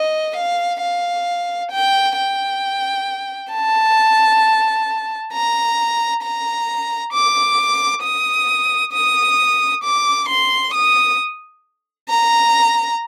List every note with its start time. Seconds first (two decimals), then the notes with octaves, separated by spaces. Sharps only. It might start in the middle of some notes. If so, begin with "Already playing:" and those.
Already playing: D#5
0.36 F5
0.81 F5
1.71 G5
2.17 G5
3.52 A5
5.33 A#5
6.22 A#5
7.13 D6
8.03 D#6
8.93 D#6
9.84 D6
10.29 C6
10.74 D#6
12.10 A#5